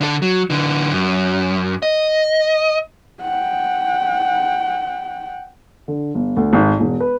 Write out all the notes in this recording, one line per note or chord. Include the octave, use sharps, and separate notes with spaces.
D3 A4
F#3
D3 E3
F#2
D#5
F#5 G5
D3
G1
D2
G#1
E1
B4